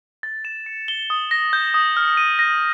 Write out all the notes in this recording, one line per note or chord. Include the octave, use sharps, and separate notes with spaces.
A6
E7
C#7
G7
D#6
A#6
G6
D#6
F6
D#7
A#6